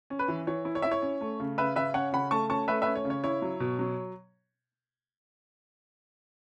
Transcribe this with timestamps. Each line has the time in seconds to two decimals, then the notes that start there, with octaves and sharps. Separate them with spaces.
0.10 C#4
0.19 B4
0.28 E3
0.47 E3 C#5
0.65 E4
0.75 C#5
0.82 E4 E5
0.92 C#5
1.02 C#4
1.21 A3
1.40 C#3
1.58 C#3 B4 E5
1.76 C#3 B4 E5
1.94 C#4 C#5 F#5
2.12 C#3 F#5 B5
2.31 A3 A5 C#6
2.50 C#4 A5 C#6
2.68 A3 B4 E5
2.82 C#4 B4 E5
2.95 C#5
3.05 C#3
3.10 C#5
3.24 E4 C#5
3.42 F#3
3.60 B2
3.79 F#3